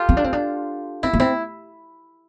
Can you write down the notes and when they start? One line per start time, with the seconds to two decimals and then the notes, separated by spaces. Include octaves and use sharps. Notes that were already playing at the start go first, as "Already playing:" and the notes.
Already playing: F4 G4 A4
0.09 C4
0.17 D4
0.24 C4
0.33 D4
1.03 C4 E4
1.14 A#3
1.20 C4 E4